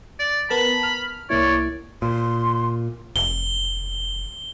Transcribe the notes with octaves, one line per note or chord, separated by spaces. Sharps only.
D5
B3 A#4 A5 B5
F6
C2 A#3 E4 C#5 D5
A#2 C6
F1 G7